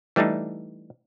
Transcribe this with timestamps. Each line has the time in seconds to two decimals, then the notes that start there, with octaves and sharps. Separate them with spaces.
0.16 E3 G3 A3 D4 D#4